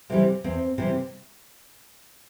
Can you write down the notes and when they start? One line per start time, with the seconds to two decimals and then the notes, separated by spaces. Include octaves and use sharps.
0.09 C3 E3 G3 A#3
0.44 E2 C4
0.78 C3 E3 G3